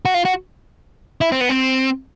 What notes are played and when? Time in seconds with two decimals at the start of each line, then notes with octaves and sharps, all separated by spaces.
0.05 F#4
0.14 F4
0.25 F#4
1.21 E4
1.32 C4
1.41 B3
1.49 C4